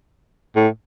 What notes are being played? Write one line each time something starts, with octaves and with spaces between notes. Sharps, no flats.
A2